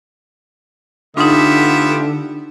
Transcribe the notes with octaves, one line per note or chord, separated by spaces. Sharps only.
D3 A3 B3 D4 D#4 F4 G4 E5